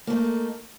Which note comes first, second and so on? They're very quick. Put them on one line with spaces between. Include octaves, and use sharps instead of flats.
A#3 A3 D#4